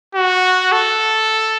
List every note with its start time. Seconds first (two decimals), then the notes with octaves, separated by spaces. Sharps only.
0.15 F#4
0.72 A4